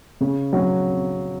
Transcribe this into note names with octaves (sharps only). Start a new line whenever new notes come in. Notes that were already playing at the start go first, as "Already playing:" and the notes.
C#3
F#3